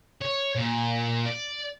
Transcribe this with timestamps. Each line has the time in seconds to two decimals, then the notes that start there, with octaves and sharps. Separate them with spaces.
0.22 C#5
0.55 A#2
1.26 D5